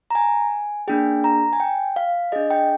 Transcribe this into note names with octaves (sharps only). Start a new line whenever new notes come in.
A#5
G#5
A#3 D4 G#4 G5
A#5
G#5
G5
F5
D4 G#4 D#5
G5